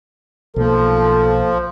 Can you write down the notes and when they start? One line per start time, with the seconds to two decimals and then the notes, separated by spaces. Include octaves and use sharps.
0.56 B1 F3 A#3 A4